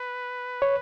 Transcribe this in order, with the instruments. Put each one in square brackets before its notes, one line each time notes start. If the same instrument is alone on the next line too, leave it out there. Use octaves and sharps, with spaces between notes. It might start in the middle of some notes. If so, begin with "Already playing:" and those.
Already playing: [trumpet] B4
[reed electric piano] C#5